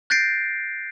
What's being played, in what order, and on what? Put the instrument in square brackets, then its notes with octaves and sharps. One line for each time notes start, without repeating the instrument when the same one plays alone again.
[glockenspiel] F#6 G6 A6 A#6 C7 D7